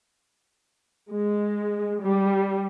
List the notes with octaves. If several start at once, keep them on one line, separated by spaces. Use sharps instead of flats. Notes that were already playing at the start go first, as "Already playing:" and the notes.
G#3
G3